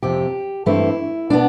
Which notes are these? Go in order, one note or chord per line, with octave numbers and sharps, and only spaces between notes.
F2 C3 F3 C4 G4
G2 E3 A3 C4 E4
B2 B3 D4